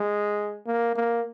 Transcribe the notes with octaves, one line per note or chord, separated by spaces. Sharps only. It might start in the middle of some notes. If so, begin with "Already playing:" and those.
Already playing: G#3
A#3
A#3